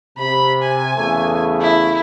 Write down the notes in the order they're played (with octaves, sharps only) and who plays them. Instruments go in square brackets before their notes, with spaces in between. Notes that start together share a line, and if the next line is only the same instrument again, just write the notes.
[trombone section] C3 [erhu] B5
[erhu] G#5
[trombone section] E2 C#3 A3
[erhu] E4